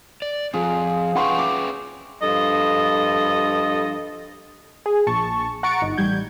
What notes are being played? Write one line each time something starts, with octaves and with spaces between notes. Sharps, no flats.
D5
F3 C4 F4 G#4
C#4 B4 F#5 G5 C6 C#6
E5 C#6 D6
G2 F3 A4 D#5
G#4
A#1 A5 C#6
F#5 A#5 C#6 A6 C#7 D7
G1 D#4
A1 G3 G6 G#6